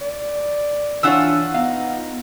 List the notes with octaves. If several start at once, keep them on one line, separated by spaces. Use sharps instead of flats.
D5
E3 D4 F4 C#5 F#5 E6
B3 D#4 F5